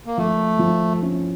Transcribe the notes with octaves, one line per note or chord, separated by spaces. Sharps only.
A#3
F3 A3
F3
C#4